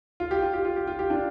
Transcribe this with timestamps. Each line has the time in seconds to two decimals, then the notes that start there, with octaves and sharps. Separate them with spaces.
0.20 F4
0.31 G4
0.42 F4
0.53 G4
0.65 F4
0.76 G4
0.87 F4
0.99 G4
1.10 D4 F4